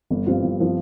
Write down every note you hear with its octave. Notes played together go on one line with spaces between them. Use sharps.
G1
G2 F3 C4 F4
G1
F3 C4 F4